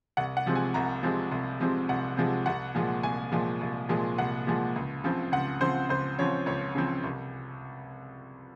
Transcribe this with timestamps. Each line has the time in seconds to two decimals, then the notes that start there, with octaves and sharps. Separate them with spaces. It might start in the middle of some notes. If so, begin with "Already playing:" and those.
0.17 C2 F#5
0.37 F#5
0.46 C3 F3 G#3 C4
0.55 G#5
0.74 C2 A#5
1.03 C3 F3 G#3 C4
1.32 C2
1.60 C3 F3 G#3 C4
1.89 C2 F#5
2.17 C3 F3 G#3 C4
2.46 C2 F#5
2.75 A#2 F3 G#3
3.03 C2 G#5
3.32 A#2 F3 G#3
3.61 C2
3.89 A#2 F3 G#3
4.18 C2 F#5
4.47 A#2 F3 G#3
4.76 C#2
5.04 C#3 F3 C4
5.32 C#2 F#5
5.61 C#3 F3 C4 C5
5.89 C#2 C5
6.19 C#3 F3 C4 C#5
6.46 C#2 C#5
6.75 C#3 F3 C4
7.04 C2